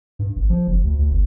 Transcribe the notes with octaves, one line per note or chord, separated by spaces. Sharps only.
G2
G#1
F3
F#1
D2
D2
G1